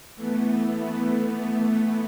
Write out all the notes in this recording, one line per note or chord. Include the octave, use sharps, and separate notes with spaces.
E3 A3 B3